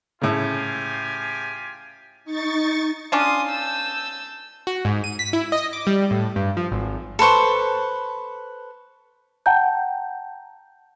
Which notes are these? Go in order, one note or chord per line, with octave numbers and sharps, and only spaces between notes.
A2 C#3 F4 G4 G#5
D#4 C#6 A6
C#4 D4 F4 C6 D#6
A5 E6 G6
F#4
G#2
D#7
B6
E4
D#5
D6
G3
A2
G2
F3
G#1
A4 B4 C5 C#6
F#5 G5 A5 A#5 G6